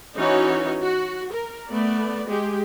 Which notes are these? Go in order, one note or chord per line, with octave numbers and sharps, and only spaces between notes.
E3 C#4 D#4 F#4 C#5
F#4
A#4
A3 B3 D5
G#3 G4 G#4